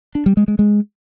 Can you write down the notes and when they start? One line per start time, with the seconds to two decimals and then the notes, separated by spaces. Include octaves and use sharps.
0.15 D4
0.26 G3
0.37 G#3
0.48 G#3
0.59 G#3